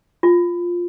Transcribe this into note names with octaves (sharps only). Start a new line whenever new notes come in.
F4